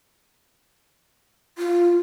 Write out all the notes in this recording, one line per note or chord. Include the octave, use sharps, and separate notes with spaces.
F4